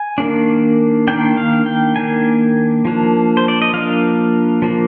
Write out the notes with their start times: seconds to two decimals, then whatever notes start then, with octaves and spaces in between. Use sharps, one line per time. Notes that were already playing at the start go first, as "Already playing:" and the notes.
Already playing: G#5
0.18 D#3 A#3 D4
1.07 D#3 A#3 D4 G5
1.37 F5
1.66 G5
1.96 D#3 A#3 D4 G#5
2.85 F3 A#3 D4
3.37 C5
3.48 D5
3.62 D#5
3.73 F3 A#3 D4 F5
4.62 F3 A#3 D4